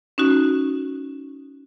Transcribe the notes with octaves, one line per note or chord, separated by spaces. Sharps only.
C#4 D#4 F#4